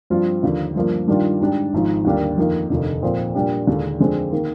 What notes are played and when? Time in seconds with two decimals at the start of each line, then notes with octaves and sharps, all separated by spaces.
0.10 G2 F3 C4 F4
0.43 D#2 D3 F3
0.75 G2 F3 A#3
1.07 G2 D#3 G3 D4 F4
1.41 G#2 G3 D4 G4
1.73 G#1 G#2 F3
2.05 D#2 D3 G3 A#3 D4
2.38 F2 D#3 A#3 D#4
2.70 F1 D#2 D3
3.02 A#2 F3 C4
3.35 A#2 G3 D4 G4
3.67 D#2 D3 G#3 D4
4.00 F2 D3 G#3 C4
4.32 D#3 A#3